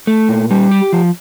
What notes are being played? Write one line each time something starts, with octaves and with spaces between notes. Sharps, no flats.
A3
A#2
G3
G4
F3